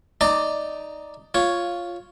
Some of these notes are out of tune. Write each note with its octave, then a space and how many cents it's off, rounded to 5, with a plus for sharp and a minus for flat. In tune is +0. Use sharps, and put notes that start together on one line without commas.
D#4 +0 D5 +0 A#5 -45
F4 +0 C#5 +0